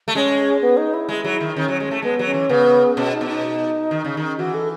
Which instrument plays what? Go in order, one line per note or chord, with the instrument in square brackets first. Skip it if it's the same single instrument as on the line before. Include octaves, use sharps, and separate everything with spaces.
[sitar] A3
[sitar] G#3 [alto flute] C#4
[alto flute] B3
D#4
E4
[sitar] G#3
F#3
D#3
[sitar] D#3 [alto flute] C#4
[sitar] F#3
G#3
A3
[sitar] G#3 [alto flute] B3
[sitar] F#3
[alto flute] C#4
[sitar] E3
[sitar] C#3 [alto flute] B3
[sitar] B2 [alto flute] C#4
[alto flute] D#4
[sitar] B2
[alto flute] D#4
[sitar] D#3
C#3
D#3
[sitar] E3 [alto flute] F#4
[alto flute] A4